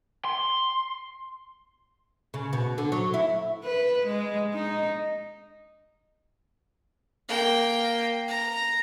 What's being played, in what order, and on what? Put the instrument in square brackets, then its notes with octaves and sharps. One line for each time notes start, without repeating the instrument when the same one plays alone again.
[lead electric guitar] C6
[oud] C#3
B2
D3
F#3
E4
[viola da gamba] B4
G#3
D#4
[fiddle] A#3 G5
A#5